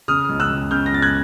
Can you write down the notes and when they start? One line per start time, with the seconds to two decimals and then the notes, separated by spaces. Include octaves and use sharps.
0.08 C#3 D#6 F6
0.29 C#2
0.40 E6 F#6
0.50 C#2
0.71 C#3 F6 G6
0.86 A#6
0.92 C#2 A6
1.02 F#6 G#6